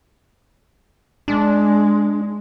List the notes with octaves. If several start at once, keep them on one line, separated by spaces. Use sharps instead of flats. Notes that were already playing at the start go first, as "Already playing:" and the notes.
G#3 D4